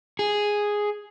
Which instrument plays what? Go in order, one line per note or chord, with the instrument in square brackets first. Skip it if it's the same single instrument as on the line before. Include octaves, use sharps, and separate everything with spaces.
[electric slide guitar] G#4